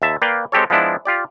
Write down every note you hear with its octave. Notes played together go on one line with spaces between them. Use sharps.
D#2 E5 A5
A#3 B4 D5 F5 G5
G#3 C4 G4 A4 C#5
F3 G#3 B3 D4 E4
F4 G4 D5